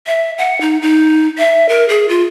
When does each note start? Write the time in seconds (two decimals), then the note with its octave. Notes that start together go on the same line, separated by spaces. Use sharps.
0.07 E5
0.38 F#5
0.61 D#4
0.82 D#4
1.38 E5
1.69 A#4
1.88 G#4
2.09 F4